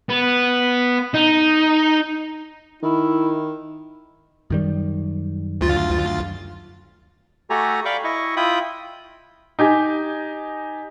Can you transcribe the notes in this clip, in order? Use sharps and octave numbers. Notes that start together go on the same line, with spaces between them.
B3
D#4
D#3 E4
F#2 D#3 G3
D2 F4 A6
A3 F#4 G4 A4 G#5 A#5
D5 F5 G5 B5 C#6 D6
E4 D#5 C#6
E4 F4 G5 B5 D#6
D#4 G4 G#5